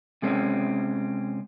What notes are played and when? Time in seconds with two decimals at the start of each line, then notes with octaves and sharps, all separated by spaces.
0.22 C3 G#3 C4 C#4